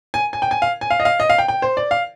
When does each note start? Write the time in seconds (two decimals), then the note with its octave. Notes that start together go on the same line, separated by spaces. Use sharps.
0.14 G#5
0.33 G#5
0.42 G5
0.51 G#5
0.62 F5
0.81 G#5
0.90 F5
1.00 D#5
1.05 F5
1.20 D#5
1.30 F5
1.38 G5
1.48 G5
1.62 C5
1.77 D5
1.91 F5